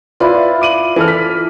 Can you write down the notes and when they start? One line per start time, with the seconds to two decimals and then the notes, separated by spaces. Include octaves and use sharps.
0.20 E4 F4 B4 D5
0.61 D6 D#7 F#7
0.96 E3 A4 D6 F6
1.08 B6